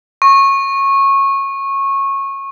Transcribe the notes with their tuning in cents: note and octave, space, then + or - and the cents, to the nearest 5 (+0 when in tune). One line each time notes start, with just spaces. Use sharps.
C#6 -20